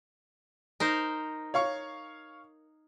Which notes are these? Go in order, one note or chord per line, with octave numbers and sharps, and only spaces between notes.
D#4 A#4 C5
C#5 F5 C#6